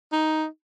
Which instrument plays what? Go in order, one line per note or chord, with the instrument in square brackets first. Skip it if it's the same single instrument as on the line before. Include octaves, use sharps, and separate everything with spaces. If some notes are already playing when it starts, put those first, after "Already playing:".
[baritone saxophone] D#4